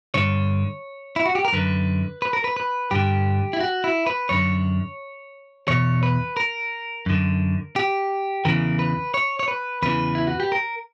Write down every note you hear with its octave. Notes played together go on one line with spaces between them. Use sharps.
G2 D3 C#5
E4
F#4
G4
A#4
F#2 D3 B4
B4
A#4
B4
B4
G2 D3 G4
E4
F#4
E4
B4
F#2 D3 C#5
E2 B2 C#5
B4
A#4
F#2 D3
G4
E2 C#3 E3 A#4
B4
C#5
C#5
B4
E2 C#3 E3 B4
E4
F#4
G4
A#4